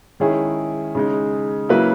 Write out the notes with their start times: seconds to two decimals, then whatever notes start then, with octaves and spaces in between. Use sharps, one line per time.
0.20 D#3 G#3 C#4 E4 G#4
0.95 C#3 G#3 D#4
1.69 C#3 F#3 A#3 E4 B4